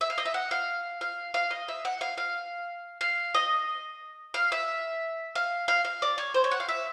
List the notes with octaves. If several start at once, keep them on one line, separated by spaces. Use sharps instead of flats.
E5
F5
D#5
E5
F#5
F5
F5
F5
D#5
E5
F#5
F5
F5
F5
D#5
F5
E5
F5
F5
F5
D5
C#5
C5
C#5
F#5
F5
E5